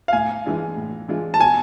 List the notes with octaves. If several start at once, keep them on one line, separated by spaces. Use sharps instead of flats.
F5
A2 G#5
E3 G#3 D4 F4
A2
E3 G#3 D4 F4
A5
B2 G#5